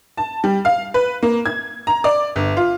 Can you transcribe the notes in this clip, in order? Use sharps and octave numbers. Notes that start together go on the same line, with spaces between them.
A5
G3
F5
B4
A#3
G#6
A#5
D5
G1
F4